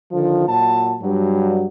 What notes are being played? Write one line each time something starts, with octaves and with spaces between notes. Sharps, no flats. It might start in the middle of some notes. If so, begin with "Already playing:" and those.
D3 D#3 F3
A#2 F#3 A5
G2 F#3